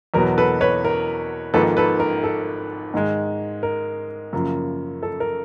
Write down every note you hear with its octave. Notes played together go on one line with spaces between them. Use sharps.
E2 B2 F#3 B3 A#4
A4 B4
B4 C#5
A#4
G#1 G#2 F3 A#3 A4 B4
A4 B4
A#4
A4
G#2 D#3 G#3
A#4
F#2 C#3 F3 A#3
A4
A#4